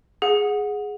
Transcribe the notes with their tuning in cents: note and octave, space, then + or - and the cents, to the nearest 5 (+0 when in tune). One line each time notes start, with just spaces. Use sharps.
G#4 +0 F#5 -20